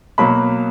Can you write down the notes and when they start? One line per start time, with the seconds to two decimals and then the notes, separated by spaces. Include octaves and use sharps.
0.18 B2 F#3 A#3 B5